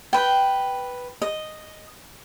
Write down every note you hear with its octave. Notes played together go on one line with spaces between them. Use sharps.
B4 G5
D#5